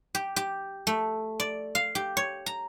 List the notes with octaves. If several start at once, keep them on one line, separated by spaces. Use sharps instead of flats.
G4
G4
A3
D5
F5
G4
C#5
A#5